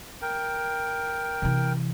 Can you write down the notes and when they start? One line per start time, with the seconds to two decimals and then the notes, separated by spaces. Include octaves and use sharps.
0.22 A#4 G5
1.42 C3 E3